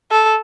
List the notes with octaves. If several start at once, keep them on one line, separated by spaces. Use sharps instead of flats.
A4